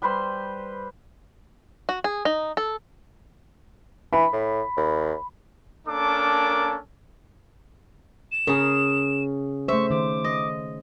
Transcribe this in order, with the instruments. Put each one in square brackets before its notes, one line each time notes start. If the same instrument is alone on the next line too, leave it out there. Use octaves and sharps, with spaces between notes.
[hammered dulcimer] G3 B4 C5 C6
[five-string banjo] F#4
G#4
D#4
A4
[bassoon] E3 [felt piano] B5
[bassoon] A2
D#2
[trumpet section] A#3 C#4 D4 A4 A#4 D6
[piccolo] E7
[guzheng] C#3 G#4 [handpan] A#4
[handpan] A3 C5 [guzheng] E5 [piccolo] C#6
[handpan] D#3 C5 [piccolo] D6
[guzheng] D#5